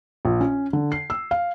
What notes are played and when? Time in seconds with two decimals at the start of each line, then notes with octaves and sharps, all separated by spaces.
0.25 A#1
0.41 C#4
0.73 D3
0.92 C7
1.10 E6
1.31 F5